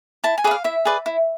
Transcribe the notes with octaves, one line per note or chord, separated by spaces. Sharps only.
E4 A5
G#5
G#4 B4 D5 E5
F5
E4 E5
G#4 B4 D5
E4